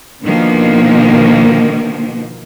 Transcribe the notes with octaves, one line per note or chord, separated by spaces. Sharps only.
B2 D3 D#3 F3 A#3